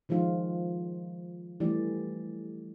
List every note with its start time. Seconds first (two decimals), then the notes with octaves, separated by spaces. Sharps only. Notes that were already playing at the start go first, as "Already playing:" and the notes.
0.09 D#3 F3 G#3 F4
1.60 E3 G3 A3 D5